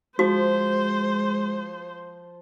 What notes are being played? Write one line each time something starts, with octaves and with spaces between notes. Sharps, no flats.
F3 G#3 F#4 C5